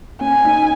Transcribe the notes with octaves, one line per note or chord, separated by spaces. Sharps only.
C#4 G#5
D#4